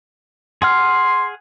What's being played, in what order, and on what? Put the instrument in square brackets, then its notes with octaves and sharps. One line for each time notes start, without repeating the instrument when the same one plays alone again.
[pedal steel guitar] G#4 F#5 F6 [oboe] C6